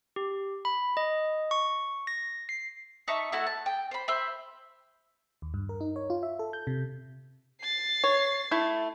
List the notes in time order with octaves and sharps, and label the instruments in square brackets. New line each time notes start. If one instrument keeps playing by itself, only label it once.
[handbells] G4
B5
D#5
C#6
A#6
C7
[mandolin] D#4 E5 A5 C#6
A3 E4 F#4
A5
G5
C5 B5
C5 E5 B5
[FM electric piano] D#2
G2
A#4
D#4
C#5
F4
E5
A4
G6
C3
[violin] A6 C7
[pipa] C#5
A3 E4